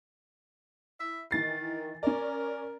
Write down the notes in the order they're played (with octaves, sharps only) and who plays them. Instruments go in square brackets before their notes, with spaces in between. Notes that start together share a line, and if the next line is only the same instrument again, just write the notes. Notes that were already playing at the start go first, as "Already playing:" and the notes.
[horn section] E4 E5
[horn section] D#3 [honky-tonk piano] E3 A6 C7
[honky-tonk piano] C#4 D5 [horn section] A#4